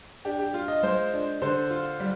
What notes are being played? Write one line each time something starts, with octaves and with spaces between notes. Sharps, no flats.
D4 G4
G4
F4
D#5
G#3 C5
D4
D3 C5
F4
G3